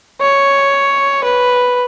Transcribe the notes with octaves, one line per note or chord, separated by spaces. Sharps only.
C#5
B4